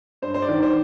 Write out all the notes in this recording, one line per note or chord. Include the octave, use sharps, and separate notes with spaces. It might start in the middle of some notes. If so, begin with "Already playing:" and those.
G2 C5
C5
D5
D#3
C5